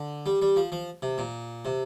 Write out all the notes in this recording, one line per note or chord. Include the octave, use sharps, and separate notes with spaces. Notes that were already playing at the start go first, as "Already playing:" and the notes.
Already playing: D3
G3
G3
F3
F3
C3
A#2
C3